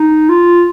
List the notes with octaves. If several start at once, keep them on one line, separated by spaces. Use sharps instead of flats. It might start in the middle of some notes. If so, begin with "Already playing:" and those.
Already playing: D#4
F4